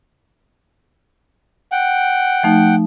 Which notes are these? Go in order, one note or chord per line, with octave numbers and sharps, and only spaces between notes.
F#5 G5
F3 A3 D#4